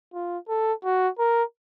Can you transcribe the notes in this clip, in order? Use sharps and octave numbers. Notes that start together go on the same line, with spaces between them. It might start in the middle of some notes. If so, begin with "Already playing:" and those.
F4
A4
F#4
A#4